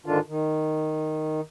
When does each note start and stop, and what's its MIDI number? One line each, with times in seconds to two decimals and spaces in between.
0.06 0.19 44
0.06 0.19 50
0.06 0.19 51
0.06 0.19 62
0.06 0.19 65
0.28 1.41 51